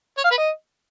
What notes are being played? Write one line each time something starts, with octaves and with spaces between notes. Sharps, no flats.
C#5
F5
B4
D#5